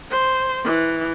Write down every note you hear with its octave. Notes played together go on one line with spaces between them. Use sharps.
C5
E3